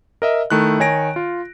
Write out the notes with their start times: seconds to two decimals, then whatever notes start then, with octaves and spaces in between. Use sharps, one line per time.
0.22 A#4 D#5 E5
0.50 D#3 A3 E4 F#6
0.80 D#3 C#5 G#5 A#6 D7
1.16 F4